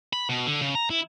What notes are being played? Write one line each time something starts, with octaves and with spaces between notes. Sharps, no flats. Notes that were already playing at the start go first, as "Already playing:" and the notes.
B5
B2
D3
C#3
A#5
E4